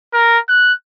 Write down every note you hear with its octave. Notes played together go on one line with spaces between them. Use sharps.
A#4
F#6